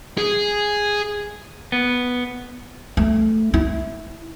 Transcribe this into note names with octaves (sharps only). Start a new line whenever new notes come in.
G#4
B3
A3
E4